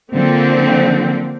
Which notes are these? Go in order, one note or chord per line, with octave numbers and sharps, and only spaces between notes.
D3 F3 A#3 C4